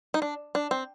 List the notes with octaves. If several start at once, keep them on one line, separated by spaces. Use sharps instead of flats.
D#4
D4
D4
C4